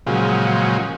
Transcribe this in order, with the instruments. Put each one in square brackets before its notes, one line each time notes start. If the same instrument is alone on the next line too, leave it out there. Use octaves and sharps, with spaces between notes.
[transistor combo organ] A#2 C#3 F3 F#3 G#3